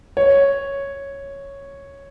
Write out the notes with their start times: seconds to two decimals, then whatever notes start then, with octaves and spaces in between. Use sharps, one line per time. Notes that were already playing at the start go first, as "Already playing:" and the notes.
0.17 C#5